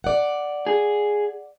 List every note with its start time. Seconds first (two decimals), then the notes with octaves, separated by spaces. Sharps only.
0.04 D5 F#5
0.66 G#4